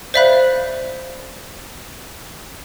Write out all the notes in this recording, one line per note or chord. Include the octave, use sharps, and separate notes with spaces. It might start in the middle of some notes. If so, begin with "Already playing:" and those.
C5 D5 E5 F5 B5 F#6